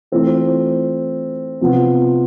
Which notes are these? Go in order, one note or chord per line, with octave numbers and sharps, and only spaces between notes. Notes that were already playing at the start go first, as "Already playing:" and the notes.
E3 A3 C4 F4
C3 F3 B3 F4